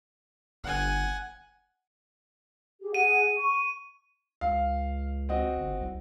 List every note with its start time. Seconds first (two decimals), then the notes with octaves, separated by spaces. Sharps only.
0.64 G1 F#5 G#5
2.81 G4 G#4
2.94 G#4 F#5 D#7
3.37 C#6
4.41 C#2 F5
5.29 C4 F#4 D#5
5.56 G1
5.81 C2